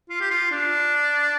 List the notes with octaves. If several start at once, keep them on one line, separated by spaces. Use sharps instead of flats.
F4
G4
F4
D4